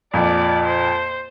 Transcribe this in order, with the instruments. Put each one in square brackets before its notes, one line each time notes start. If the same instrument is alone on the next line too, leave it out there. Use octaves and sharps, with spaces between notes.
[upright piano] F2 A#2 [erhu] D5
[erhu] C5